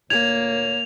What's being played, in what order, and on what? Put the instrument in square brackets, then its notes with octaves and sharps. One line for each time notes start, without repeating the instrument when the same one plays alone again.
[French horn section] D2 A#2 C#5 [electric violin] A#3 [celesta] G#6 [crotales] F7